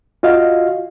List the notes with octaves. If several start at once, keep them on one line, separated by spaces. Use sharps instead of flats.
F4 F#4 D#5 F5